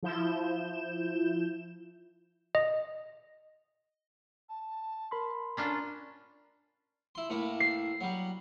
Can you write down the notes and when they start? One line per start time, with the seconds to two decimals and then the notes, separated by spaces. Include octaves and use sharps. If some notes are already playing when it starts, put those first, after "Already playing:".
0.03 F3 E4 G6 E7
2.55 D#5
4.49 A5
5.11 A#4 B5 C6
5.57 C#4 D4 F4 A#5
7.15 E4 C6
7.30 A2 A#3 E4
7.60 C7
8.01 F#3 G3